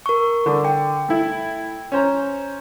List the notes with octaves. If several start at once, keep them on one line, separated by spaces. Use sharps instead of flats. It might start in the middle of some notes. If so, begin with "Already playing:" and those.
A#4 C#6
D3
G5
A3 E4
C#4 C5 A#5